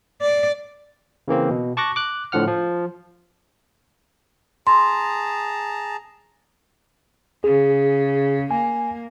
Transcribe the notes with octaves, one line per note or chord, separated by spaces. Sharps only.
D5
C#3 E3 A#3 C4
B2
A5 C#6 D6 F#6 A#6
D6 F#6
A2 D3 F3 F#5 F6
F3
G#4 A5 A#5 C6
C#3 G#4
A#3 G#5